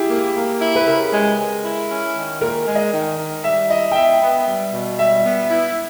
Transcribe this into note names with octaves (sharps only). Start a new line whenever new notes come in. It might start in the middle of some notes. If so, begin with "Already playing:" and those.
Already playing: E4 G4 G#4
A#3
A#3
E4
B4
C#3 A#4
G#3
G#3
E4
C#4
D#3
A#2 A#4
G#3
D#5
D#3
D#3
G3 E5
E4 D#5
G5
B3 E5
B3
G3
B2
G3 E5
B3
E4